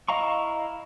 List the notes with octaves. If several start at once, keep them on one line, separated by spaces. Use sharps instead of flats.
E4 D#5 F5 A#5 C#6